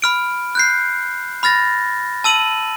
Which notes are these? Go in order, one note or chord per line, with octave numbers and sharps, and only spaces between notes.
B5 F6 D7
F#6 G6 C7
B5 F6 A6 A#6
A5 E6 D#7 F#7